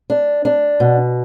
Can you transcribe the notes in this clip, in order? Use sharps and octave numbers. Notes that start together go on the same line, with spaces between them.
D4
D4
B2